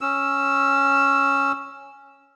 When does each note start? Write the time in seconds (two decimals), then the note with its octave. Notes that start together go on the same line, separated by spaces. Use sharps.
0.01 C#4 E6